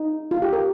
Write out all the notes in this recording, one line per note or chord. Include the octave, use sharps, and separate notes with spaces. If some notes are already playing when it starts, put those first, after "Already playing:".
Already playing: D#4
F4
G4
A#4